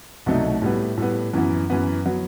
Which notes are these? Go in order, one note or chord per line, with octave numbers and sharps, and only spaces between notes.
C2 B2 F#3 A3 D#4
A2 G3 B3
A2 G3 B3
F#2 E3 B3
F#2 E3 B3
F#3 B3